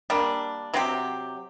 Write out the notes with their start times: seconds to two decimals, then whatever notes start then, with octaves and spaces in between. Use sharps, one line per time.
0.10 G3 A#3 D4
0.74 C3 F#3 C4 G4